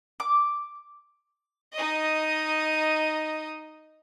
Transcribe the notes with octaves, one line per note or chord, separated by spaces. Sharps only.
D6
D#4 D#5